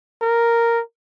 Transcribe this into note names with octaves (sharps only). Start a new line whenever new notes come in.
A#4